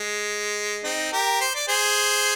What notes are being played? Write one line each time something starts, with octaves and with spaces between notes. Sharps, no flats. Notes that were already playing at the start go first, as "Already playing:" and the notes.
Already playing: G#3
C4 D#4
G4 A#4
C5
D5
G#4 C5